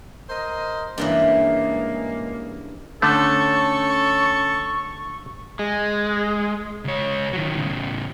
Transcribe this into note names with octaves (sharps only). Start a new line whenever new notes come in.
A#4 C5 D#5
G2 C#3 E3 G#3 A#3
D3 A3 C#4 A4 C#6
G#3
C#2 C#5
D#3 F#3
A2 C#3